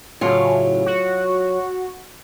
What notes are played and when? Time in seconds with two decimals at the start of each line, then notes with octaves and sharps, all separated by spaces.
0.21 A2 C#3 F#3 F4
0.86 F#4